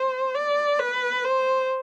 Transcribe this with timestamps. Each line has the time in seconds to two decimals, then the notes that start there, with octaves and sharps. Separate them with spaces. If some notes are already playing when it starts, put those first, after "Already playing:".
Already playing: C5
0.35 D5
0.80 B4
1.24 C5